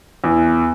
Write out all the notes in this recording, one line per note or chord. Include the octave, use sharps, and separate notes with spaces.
E2